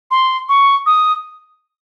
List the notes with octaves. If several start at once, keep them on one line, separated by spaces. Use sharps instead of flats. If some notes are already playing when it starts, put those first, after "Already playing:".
C6
C#6
D#6